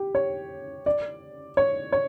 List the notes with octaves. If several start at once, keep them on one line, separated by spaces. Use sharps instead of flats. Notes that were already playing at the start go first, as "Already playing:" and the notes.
Already playing: G4
C#5
D5
C#5
C#5